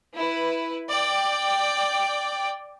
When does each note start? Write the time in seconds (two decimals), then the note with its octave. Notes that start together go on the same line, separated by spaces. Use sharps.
0.16 E4 B4
0.88 D5 G5